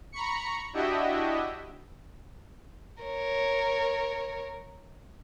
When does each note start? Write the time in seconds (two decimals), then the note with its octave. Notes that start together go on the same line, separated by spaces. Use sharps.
0.12 A#5 B5 C#6 C#7
0.73 D4 E4 F#4 G4 D#5 E5
3.03 A#4 C#5